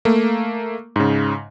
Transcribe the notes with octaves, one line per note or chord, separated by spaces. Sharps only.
A3 A#3
G#2 C#3